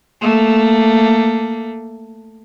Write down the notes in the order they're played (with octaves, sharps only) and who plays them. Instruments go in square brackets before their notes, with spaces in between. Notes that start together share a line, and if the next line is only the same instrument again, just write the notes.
[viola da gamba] A3 A#3